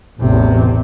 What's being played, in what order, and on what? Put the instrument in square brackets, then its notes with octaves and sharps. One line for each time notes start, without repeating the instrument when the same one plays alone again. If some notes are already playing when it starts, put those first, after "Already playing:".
[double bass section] A1 E2 [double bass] C3